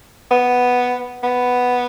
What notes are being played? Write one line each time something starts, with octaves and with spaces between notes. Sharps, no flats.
B3
B3